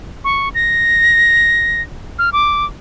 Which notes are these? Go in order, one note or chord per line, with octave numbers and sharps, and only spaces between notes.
C#6
A#6
F6
D6